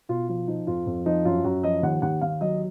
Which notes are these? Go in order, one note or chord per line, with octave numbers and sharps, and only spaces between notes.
B2 F4
F3 F4
F3 D#4
F2 F4
F2
F3 D#4
F#2 F4
F#2 F#4
F3 D#5
D#2 F#5
D#2 F#5
D#2 F5
F#3 D#5